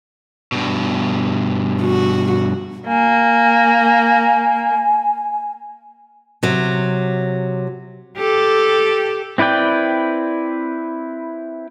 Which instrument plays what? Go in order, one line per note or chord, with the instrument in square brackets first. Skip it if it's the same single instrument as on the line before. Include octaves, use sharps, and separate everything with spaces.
[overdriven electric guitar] G2 B2
[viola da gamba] F#4
[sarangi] A#3 [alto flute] G#5
[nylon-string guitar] C3 F#3
[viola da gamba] G4 A4
[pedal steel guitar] C4 E4 B4 D5 G5